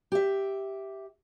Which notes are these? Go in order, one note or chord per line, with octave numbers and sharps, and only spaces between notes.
G4 E5